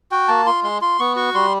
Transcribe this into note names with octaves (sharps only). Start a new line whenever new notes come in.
F#4 G5
A#3 A5
F4 C6
G#3 C6
F4 C6
B3 C#6
F#4 C#6
G3 C6